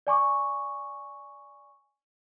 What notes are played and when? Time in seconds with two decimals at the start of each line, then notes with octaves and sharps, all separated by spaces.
0.07 D5 G#5 C#6 D6